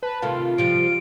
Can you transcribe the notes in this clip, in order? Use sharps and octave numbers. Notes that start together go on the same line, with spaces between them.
B4 A5
C3 D#3 A3 F4
C3 F3 G3 D7